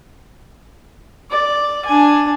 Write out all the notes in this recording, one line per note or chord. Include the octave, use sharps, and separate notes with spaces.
D5
D4 G#5